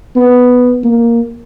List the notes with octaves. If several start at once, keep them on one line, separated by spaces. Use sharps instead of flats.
B3
A#3